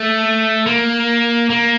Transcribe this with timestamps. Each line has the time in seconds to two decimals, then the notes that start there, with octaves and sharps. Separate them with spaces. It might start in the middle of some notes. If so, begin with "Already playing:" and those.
Already playing: A3
0.67 A#3
1.50 A#3